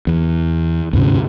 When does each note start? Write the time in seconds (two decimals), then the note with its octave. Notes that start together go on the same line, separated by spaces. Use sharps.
0.07 E2
0.93 D2 G2 C3 C#4